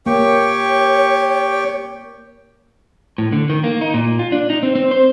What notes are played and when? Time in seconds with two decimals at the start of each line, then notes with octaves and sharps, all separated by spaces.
0.06 A#3 G4 C#5 G5 C#6
3.18 A2
3.32 D3
3.50 D#3
3.64 A#3
3.81 D#4
3.94 A#2
4.19 F4
4.32 D4
4.50 D#4
4.63 C4
4.76 C4
4.91 C5